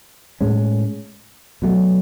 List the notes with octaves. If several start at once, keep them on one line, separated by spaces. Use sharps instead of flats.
A2 G#3 C#4
B2 F#3 A3